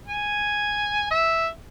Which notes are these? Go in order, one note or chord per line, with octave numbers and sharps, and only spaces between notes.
G#5
E5